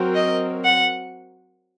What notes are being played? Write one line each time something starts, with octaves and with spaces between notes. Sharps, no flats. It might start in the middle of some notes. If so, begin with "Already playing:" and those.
Already playing: F#3 C4 F#4 A#4
D#5
F#5